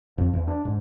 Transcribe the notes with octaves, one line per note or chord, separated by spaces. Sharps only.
F2
E2
D4
G#2